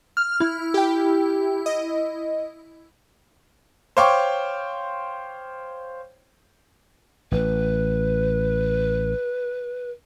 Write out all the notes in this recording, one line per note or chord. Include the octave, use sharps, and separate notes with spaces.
F6
E4
G4 G5
D#5
C5 C#5 F5 G5 C#6 D6
A1 B4